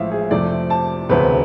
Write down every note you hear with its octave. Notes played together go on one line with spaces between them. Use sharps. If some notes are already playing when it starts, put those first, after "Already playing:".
Already playing: A1 A2 F3 G#3 E5 F5
G#4
F2 C3 F3 A3 D5
A5
E1 D2 C3 B4